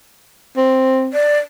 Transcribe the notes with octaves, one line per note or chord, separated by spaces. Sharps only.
C4
D5